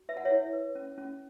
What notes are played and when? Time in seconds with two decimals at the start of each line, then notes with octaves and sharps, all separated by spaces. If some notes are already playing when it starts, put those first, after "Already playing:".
Already playing: F#4
0.09 B4 E5
0.17 F#5
0.25 C#5 E5
0.30 E4
0.53 B4
0.75 C#4
0.98 C#4